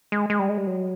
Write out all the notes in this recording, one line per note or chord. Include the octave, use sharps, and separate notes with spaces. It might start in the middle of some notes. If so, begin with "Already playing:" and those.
G#3
G#3
G3
G#3
G3
F#3